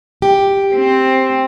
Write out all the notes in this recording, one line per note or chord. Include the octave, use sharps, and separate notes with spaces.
G4
C4